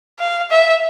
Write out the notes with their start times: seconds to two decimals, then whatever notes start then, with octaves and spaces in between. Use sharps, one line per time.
0.19 F5
0.51 E5